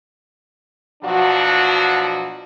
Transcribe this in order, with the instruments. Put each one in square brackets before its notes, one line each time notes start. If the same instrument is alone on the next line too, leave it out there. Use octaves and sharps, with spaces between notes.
[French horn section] B2 F3 F#3 D4 F#4